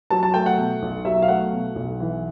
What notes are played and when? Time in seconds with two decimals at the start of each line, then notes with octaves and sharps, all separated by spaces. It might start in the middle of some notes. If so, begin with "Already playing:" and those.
0.10 F#3 A5
0.23 A5
0.34 A3 G5
0.46 F#5
0.58 B2
0.82 B1
1.05 F#3 E5
1.22 F5
1.28 A3 F#5
1.52 B2
1.76 B1
2.00 E3